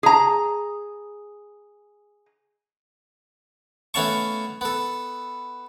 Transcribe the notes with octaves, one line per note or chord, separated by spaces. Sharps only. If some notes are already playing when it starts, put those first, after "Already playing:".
G#4 A#5
A3 B3 C#4 F5 A5 C#6
B3 A4